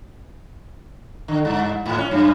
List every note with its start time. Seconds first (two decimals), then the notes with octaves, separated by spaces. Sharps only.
1.28 D3
1.45 G2
1.86 G#2
1.98 C#4
2.11 F#2